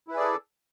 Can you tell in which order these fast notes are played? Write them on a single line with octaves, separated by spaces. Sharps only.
E4 B4 G#4 D5 A4